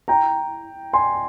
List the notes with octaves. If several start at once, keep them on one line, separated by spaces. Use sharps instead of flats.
G5 A#5
G#5 C6